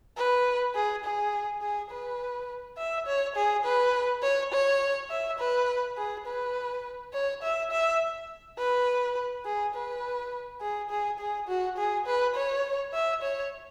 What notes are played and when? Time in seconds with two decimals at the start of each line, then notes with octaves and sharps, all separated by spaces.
0.17 B4
0.75 G#4
1.04 G#4
1.62 G#4
1.91 B4
2.78 E5
3.07 C#5
3.36 G#4
3.65 B4
4.23 C#5
4.52 C#5
5.10 E5
5.39 B4
5.97 G#4
6.27 B4
7.13 C#5
7.43 E5
7.71 E5
8.58 B4
9.46 G#4
9.75 B4
10.61 G#4
10.90 G#4
11.19 G#4
11.48 F#4
11.77 G#4
12.07 B4
12.35 C#5
12.93 E5
13.22 C#5